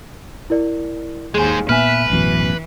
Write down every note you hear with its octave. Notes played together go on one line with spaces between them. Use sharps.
E4 A#4 D5
D#2 G#3 G#4 C5 G#5
A#2 B3 B4 E5 G#5 F6
A1 F#2 B2 E3